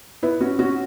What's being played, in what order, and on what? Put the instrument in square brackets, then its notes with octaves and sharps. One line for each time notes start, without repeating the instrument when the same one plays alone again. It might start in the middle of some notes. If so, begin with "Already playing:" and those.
[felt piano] B3 E4
C#4 F#4
C#4 F#4